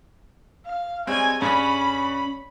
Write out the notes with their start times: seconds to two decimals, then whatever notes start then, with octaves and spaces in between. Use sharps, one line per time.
0.66 F5
1.07 G3 G#3 C4 C#5 G#5
1.42 G2 C#4 G#4 C#5 B5